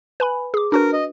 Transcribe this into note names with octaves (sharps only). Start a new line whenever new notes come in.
B4 G#5 B5
G#4 D6
D4 F#4 A#4 B4
D#5